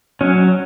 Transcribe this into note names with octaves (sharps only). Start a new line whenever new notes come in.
F#3 C#4